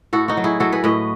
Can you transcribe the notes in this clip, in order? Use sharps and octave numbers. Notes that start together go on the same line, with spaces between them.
A2 F#4 A4
D#4 F#4
F#3
E4 G#4
F#3 F#4 A4
G#4 B4
A2 B4 D#5